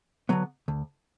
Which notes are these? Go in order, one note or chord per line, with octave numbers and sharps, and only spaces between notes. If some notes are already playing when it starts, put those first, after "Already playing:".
D3 F#3 B3
D2